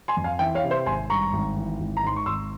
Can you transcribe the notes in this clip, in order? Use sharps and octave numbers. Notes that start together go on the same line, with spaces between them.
G#5 C6
F2
F5 G#5
E3 E5 G5
C#5 F5
C3
C5 E5
G#1 G#5 C6
G2 A#5 C#6
G#1
E3
G#1
A#5
G#2 C6
C#6
G#1 C6 E6